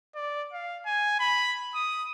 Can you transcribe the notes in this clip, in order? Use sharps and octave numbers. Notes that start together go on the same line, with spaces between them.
D5
F5
G#5
B5
D#6